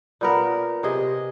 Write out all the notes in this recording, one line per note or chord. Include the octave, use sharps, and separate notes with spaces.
A#2 B3 A#4
C3 G#4 D#5